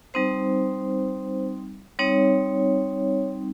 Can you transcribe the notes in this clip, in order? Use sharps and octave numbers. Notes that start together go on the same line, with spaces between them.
G3 C4 D#4 C5
G3 C4 D#4 C#5